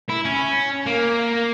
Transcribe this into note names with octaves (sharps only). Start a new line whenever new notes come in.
E4
C#4
A#3